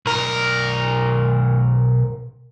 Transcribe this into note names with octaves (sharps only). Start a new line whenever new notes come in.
B1 A#4